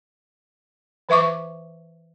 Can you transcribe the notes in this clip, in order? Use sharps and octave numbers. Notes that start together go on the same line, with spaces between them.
E3 B4 E5 C#6 D6